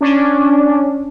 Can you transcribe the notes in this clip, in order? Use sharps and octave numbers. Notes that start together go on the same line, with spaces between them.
C#4 D4